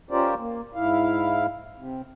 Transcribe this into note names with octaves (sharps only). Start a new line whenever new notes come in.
C#4 F4 G4 A#4 C5 D5
A#3
G#2 E4 F5
C3